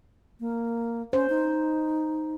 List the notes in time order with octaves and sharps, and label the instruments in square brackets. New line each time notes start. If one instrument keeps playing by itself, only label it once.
[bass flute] A#3
[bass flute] C#4 [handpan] C5
[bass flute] D#4